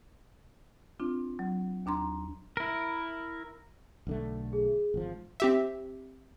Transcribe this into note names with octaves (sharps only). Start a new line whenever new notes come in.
C4 D4 F4
F#3
D#2 D4 A#5 C6
E4 A#4
B1 D3 A3
G#4
G#1 F3
C4 G4 E5